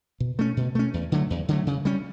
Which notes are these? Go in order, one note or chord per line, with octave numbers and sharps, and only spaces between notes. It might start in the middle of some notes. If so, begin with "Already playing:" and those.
B2
A3 C#4
B2
A3 C#4
E2
D3 F#3 A3
E2
D3 F#3 A3
C#3
G3 C#4